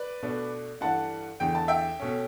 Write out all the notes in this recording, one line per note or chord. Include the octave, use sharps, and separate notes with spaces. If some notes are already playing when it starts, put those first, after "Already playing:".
Already playing: B4 D5
B2 A3 D4
G2 E3 A3 D4 F#5 A5
E2 D3 A3 G5
A5
E5 G5
B2 A3 C#4